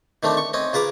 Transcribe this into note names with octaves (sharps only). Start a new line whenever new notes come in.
D#3 A3 C4 D4
C#6
C4 C#4 D#5
C#3 F4 B4 A#5 D6